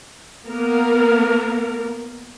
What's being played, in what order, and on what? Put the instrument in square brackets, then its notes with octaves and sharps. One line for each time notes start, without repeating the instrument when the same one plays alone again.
[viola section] A#3 B3 A#4